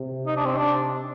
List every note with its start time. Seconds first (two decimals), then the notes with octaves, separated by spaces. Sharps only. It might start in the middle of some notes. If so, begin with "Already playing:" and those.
Already playing: C3
0.27 D#4
0.37 D4
0.46 C4
0.56 D4